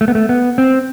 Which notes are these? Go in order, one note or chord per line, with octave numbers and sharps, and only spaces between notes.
A3
B3
A3
B3
C4